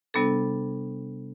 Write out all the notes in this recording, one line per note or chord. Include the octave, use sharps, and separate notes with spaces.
C3 G3 B3 D4 A4